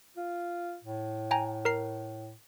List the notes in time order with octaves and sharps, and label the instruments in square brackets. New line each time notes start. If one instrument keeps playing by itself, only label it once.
[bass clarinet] F4
A2
[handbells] G5 G#5 A#5
A#4 A#5 C7